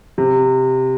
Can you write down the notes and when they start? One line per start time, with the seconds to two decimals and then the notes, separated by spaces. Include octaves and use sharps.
0.18 C3